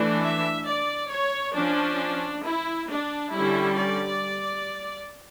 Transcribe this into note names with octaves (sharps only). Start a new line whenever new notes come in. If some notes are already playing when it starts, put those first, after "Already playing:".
Already playing: E3 A3 D4
E5
D5
C#5
F3 C#4 D4
E4
D4
D3 G3 C#4 E4
D5